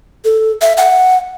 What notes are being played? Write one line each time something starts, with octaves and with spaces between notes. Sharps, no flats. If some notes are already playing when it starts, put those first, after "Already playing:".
A4
E5
F#5